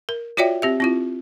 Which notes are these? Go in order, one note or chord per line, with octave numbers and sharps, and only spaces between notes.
A#4
F4 F#4 C#5 D5 E5 G5
C4 G4 E5
C4 E4 F4